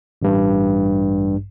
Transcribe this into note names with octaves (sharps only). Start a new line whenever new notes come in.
A1 G2